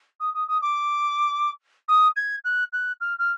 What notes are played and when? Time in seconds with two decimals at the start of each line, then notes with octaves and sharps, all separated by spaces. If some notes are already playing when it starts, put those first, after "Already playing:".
0.20 D#6
0.34 D#6
0.48 D#6
0.62 D6
1.88 D#6
2.16 G#6
2.44 F#6
2.72 F#6
3.00 F6
3.18 F6